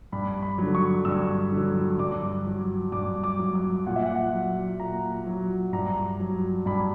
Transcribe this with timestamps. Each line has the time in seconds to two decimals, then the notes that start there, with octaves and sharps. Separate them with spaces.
0.12 G2 B5
0.43 B5
0.58 D3 F#3
0.75 C#6
1.05 G2 E6
1.52 D3
1.57 F#3
1.99 G2 D6
2.46 F#3
2.92 G2 D6
3.24 D6
3.39 F#3
3.55 D6
3.86 A#2 F#5
3.96 E5
4.06 F#5
4.33 F#3
4.80 A#2 A#5
5.26 F#3
5.73 G2 A#5
6.20 F#3
6.66 G2 B5